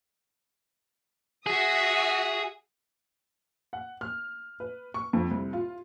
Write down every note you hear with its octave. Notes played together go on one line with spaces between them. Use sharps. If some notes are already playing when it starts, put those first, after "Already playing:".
F#4 G#4 E5 D#6
F#5
F6
B4
C#6
F2
C2
F4